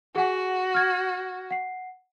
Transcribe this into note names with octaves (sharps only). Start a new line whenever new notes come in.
F#4 G#4 F#5 G#5
F6 G#6
F#5 C7